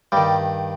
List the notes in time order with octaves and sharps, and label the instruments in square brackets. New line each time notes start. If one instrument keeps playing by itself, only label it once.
[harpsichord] G2 D#3 G3